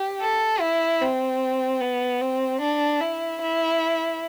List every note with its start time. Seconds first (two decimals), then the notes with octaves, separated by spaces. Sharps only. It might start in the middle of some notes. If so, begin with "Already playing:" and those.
Already playing: G4
0.21 A4
0.60 E4
1.01 C4
1.81 B3
2.21 C4
2.61 D4
3.00 E4
3.41 E4